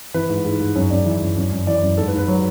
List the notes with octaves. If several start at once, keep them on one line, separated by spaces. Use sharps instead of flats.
E3 B4
G#2
G#2
G#2
F#2 C#5
F#2 D5
E3
F#2
F#2
F#2
E3 D5
F#2
G#2 A4
B4
G#2
B4
F#3